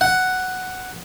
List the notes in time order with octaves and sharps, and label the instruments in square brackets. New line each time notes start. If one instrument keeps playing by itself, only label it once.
[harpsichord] F#5